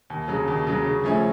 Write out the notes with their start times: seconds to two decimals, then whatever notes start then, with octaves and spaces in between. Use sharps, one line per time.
0.10 D#2
0.28 C#3 F#3
0.48 D#2
0.67 C#3 F#3
0.86 C#3
1.04 F3 A3 C#4 E4